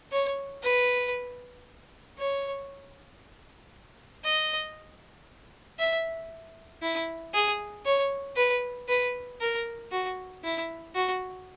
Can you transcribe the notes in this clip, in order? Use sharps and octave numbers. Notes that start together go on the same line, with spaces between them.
C#5
B4
C#5
D#5
E5
E4
G#4
C#5
B4
B4
A#4
F#4
E4
F#4